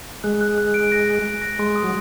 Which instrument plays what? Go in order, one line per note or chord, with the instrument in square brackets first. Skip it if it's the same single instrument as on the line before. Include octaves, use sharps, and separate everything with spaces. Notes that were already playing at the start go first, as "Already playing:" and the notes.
[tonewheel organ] G#3 [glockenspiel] F#6
[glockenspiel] F#6
F#6
D7
A#6
F#6
F#6
A#6
[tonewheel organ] G#3 [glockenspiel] C6
[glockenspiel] D#6
[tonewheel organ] F#3